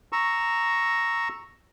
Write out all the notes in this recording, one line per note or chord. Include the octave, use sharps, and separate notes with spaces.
A#5 C#6 E6